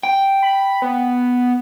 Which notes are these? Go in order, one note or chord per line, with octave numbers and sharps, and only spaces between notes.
G5
B5
B3